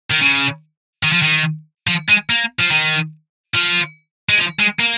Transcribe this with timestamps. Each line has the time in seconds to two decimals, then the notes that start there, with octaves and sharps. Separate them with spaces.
0.10 D#3
0.20 C#3
1.03 D#3
1.13 F3
1.22 D#3
1.87 F3
2.09 G#3
2.30 A#3
2.59 F3
2.71 D#3
3.55 F3
4.29 G#3
4.38 F3
4.60 G#3
4.80 A#3